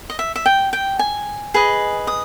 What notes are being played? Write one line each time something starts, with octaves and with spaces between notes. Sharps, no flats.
D#5
E5
E5
G5
G5
G#5
G#4 B4 D#5
D#6